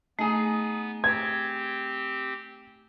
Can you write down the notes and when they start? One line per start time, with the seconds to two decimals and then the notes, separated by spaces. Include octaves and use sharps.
0.19 A3 B3 D#4 G#4
1.04 C4 G4 G#6